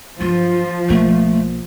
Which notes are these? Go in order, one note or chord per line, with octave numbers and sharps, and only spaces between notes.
G2 F3 F#3 F4
B1 A3 A#3